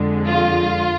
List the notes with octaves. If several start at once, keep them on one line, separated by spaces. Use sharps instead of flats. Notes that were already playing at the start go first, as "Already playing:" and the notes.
Already playing: F2 D3 G#3
F4